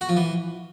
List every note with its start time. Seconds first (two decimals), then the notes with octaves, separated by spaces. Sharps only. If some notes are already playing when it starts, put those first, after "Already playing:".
0.01 F#4
0.09 F3
0.17 E3